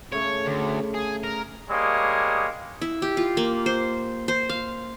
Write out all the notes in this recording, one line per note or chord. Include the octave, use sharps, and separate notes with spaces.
C#3 A3 C#5
D2
G#4
A#4
G3 G#3 A#3 C#5 D#6
E4
G4
F4
A#3
C5
C5
F5